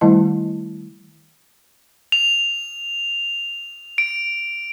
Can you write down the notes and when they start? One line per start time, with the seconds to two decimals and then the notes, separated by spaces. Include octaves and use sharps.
0.01 D#3 G3 A3 E4 D#5 A5
2.12 F7
3.98 D7